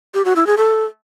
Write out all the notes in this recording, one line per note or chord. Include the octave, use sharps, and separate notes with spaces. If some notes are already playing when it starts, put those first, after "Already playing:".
G4
F#4
E4
G#4
A4